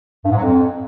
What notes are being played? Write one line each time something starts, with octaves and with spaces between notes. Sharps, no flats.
G2
G#2
F#3
F2